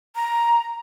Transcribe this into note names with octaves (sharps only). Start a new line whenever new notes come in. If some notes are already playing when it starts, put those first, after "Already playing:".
A#5